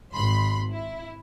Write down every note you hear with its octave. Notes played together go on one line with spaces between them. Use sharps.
G#1 B5 C6
E4